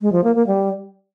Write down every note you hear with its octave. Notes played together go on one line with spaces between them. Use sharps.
G#3
F3
A#3
A#3
G3